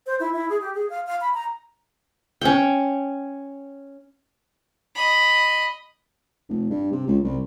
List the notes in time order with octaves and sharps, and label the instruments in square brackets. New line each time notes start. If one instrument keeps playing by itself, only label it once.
[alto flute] C5
E4
E4
G#4
G4
G#4
F5
F5
B5
A#5
[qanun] C#4 G5
[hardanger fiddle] D#5 B5
[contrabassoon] F1
G2
C3
C#2
C2